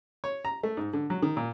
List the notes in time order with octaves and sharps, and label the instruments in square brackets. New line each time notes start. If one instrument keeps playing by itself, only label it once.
[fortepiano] C#5
A#5
A3
G#2
D3
F#3
D#3
A#2